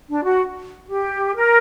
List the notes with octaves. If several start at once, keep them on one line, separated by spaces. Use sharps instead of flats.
D4
F#4
G4
A#4